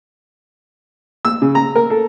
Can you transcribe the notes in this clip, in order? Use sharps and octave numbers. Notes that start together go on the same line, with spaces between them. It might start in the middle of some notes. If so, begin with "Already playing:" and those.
E6
C#3
A#5
A#4
A4